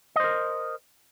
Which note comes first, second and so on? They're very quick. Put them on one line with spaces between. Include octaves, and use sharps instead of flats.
D#5 C5 A#4